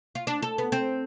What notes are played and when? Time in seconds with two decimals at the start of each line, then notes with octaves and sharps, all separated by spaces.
0.15 F4
0.27 D4
0.42 A4
0.58 B3
0.72 C4